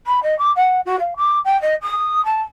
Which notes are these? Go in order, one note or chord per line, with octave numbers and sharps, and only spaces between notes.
B5
D#5
D6
F#5
F#4
F5
D6
G5
D#5
D#6
A5